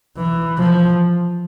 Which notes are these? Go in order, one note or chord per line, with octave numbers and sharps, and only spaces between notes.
E3
F3